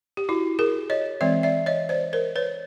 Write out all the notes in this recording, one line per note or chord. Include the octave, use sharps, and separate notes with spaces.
G4
E4 F#4
G#4 A#4
C#5 D#5
E3 G#3 C4 D5 E5
D5 E5
C#5 D#5
C5 D5
A#4 C5
B4 C#5